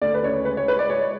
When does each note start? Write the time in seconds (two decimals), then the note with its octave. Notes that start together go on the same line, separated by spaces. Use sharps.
0.01 D2 D5
0.14 B4
0.23 C#3 C#5
0.45 G#3 B4
0.57 C#5
0.68 G#3 B4
0.79 D5
0.90 G#3 C#5